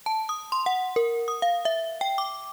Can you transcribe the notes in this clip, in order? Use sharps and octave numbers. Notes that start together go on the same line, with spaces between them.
A5
D#6
C6
F#5
A#4
D#6
F5
E5
G5
D6